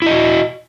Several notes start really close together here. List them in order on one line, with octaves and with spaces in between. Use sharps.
E4 D#5 F#4